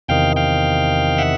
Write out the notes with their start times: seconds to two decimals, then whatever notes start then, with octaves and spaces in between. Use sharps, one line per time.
0.09 E2 C3 D#3 F5 G5
0.36 F5 G5
1.18 E5 F#5